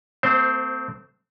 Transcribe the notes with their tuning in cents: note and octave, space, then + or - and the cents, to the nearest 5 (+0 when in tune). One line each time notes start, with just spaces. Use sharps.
A3 +25 C4 -25 C5 +0